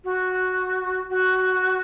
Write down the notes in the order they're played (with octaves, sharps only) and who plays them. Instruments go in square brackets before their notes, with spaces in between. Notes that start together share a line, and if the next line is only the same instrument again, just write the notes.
[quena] F#4
F#4